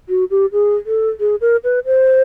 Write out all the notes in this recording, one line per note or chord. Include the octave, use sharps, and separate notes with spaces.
F#4
G4
G#4
A4
G#4
A#4
B4
C5